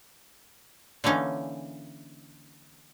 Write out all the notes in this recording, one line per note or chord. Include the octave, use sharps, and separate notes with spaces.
D3 E3 A#3 C#4 D#4